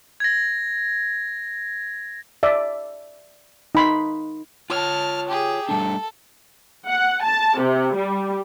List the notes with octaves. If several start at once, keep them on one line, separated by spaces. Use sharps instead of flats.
G#6 A#6
D5 E5
D#4 B5 C6
F4 C#5 A5 F6
G4 G#4
G3 A3 D4 A4
F#5
A5
C3
G3